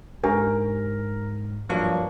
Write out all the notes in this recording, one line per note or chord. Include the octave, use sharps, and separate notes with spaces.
G#2 D4 G4 A#4 G#5
G2 F3 F#3 A#3 C#6